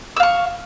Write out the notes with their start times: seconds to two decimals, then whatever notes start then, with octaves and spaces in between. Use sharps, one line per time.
0.17 E6
0.20 F5
0.23 C#6